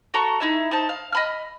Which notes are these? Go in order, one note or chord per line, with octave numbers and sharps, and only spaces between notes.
F#4 A4 A#5 C#6
D#4 E4 E5
D#4 C5 A5
F5
D#5 B5 F6